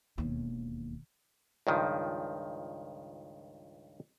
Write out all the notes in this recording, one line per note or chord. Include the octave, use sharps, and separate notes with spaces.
E1 D#2
C#2 G2 D#3 F3